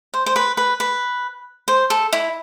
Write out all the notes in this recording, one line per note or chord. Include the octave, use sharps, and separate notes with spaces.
C5
C5
B4
B4
B4
C5
A4
E4